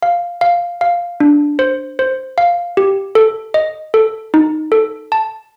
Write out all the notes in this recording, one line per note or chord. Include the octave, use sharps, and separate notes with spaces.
F5
F5
F5
D4
C5
C5
F5
G4
A4
D#5
A4
D#4
A4
A5